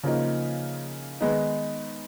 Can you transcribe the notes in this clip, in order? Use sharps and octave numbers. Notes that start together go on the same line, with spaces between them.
C#3 F3 A#3 D#4
D#3 G#3 B3 D#4